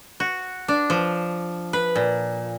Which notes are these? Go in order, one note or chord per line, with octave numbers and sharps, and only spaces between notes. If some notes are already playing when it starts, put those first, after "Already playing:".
F#4
D4
F3
B4
A#2